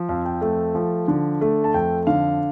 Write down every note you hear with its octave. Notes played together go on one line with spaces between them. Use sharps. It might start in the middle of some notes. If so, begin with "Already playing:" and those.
Already playing: F3
F2 F5
G5
A3
F3
D3
A3
A5
F2 G5
D3 F5